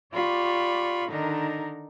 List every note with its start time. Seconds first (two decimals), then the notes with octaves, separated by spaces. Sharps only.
0.12 F4 G4 D5 B5 C#6
1.08 D3 D#3 D4 D#4 A#4